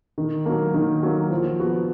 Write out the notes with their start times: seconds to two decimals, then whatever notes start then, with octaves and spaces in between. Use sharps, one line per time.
0.18 D#3
0.46 F#3 A#3
0.74 D#3
1.03 F#3 A#3
1.31 F3
1.60 B3 F#4